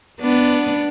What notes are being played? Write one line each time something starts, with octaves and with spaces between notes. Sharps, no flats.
B3 D4